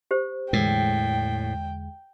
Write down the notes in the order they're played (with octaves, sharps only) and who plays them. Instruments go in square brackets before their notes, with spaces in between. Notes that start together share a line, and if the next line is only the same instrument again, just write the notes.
[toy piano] G4 C5
[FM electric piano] E2 D3 G#3 [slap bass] A2 [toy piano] A#4 [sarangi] G5